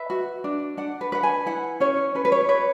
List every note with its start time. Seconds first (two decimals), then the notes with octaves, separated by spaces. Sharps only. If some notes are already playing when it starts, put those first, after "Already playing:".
Already playing: B4 E5
0.10 F#4
0.44 D4
0.77 D4 F#5
1.01 B4
1.12 B4 F#5
1.23 G#5
1.46 E4 F#5
1.80 C#4 C#5
2.15 C#4 B4
2.25 B4
2.32 C#5
2.49 B4 C#5